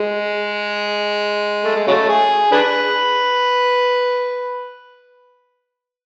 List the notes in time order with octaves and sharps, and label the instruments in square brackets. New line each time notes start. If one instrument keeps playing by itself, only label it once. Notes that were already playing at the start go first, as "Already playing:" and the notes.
Already playing: [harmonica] G#3
A3
G#3
C#3 F#3 A3
G#4
D4 G#4 B4